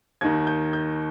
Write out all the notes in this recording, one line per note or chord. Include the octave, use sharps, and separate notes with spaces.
D#2 D#3 G#6
G6
G6